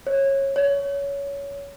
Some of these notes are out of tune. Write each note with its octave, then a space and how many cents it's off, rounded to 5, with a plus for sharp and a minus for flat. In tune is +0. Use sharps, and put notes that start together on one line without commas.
C#5 -20
C#5 +20